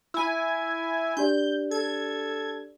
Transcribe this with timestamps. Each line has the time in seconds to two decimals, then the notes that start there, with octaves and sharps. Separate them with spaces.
0.14 E4 G#5
1.17 D4 G4 D5 G6
1.71 A4 G#6